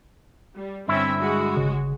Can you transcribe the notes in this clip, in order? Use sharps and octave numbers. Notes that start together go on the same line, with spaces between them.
G3
G2 D3 C4 C#4 E4 E5
G#3 F#4
G1 C#3